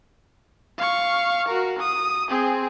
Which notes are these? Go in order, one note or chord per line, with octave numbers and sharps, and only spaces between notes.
F5 C#6
F#4 A#4
D#6
C4 G#4